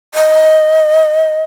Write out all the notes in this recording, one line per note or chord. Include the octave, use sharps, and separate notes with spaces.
D#5